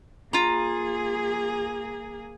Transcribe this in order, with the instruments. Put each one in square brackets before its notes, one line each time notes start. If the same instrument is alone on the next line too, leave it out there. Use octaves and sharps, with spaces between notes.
[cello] A#3 G#4 [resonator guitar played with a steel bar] F4 A#5